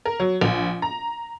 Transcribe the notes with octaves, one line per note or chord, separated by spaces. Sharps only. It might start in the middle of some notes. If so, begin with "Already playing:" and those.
A#4
F#3
A#1
A#5